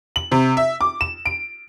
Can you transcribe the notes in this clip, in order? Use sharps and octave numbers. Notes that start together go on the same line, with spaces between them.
F#7
C3
E5
D6
E7
D7